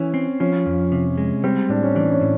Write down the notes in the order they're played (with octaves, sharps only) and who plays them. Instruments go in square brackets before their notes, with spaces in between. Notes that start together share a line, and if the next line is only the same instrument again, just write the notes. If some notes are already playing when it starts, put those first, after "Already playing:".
Already playing: [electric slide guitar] E3 [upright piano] C#4
[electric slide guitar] C4
[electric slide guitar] F3 [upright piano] C#4
[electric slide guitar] F2
C3
G#3
[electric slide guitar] G3 [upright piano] C4
[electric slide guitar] A2 [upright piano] D4
[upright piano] C#4
[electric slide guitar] E3 [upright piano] D4
[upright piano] C#4
[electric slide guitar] A2